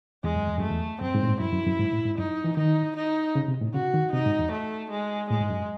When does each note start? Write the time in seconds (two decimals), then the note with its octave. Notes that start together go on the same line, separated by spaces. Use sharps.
0.24 E2 G#3
0.35 F#2
0.47 E2
0.58 F#2 A3
0.70 E2
1.01 F#2 C4
1.15 G#2
1.23 A2
1.27 G#2
1.40 F#2 E4
1.53 F#2
1.66 F#2
1.79 G#2
1.92 A2
2.05 G#2
2.18 F#2 D#4
2.44 E3
2.57 D#3 D#4
2.96 D#4
3.35 C#3
3.48 C3
3.61 A2
3.74 C#3 F#4
3.94 D#3
4.13 C3 D#4
4.26 G#2
4.39 E2
4.52 A3
4.91 G#3
5.30 A2 G#3
5.40 G#2
5.50 F#2